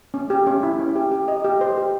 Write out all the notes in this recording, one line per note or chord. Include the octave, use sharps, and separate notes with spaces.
C#4
G4
C#4
E4
C#4
G4
G4
D#5
G4
C5
G4